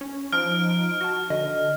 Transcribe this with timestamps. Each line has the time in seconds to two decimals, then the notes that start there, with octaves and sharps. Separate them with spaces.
0.01 C#4
0.33 F3 D#4 F6 D7
1.01 F#4 A5
1.30 D3 D#5